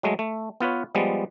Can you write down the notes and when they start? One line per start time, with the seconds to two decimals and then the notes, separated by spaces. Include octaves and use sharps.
0.03 F#3 G#3 A3
0.19 A3
0.60 B3 F4 B4 C#5
0.95 F3 G3 G#3 B3